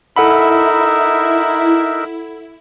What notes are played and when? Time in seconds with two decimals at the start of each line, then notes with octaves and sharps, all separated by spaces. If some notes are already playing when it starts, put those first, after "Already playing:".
0.16 D#4 E4 A4 A#4 E5 F#5 B5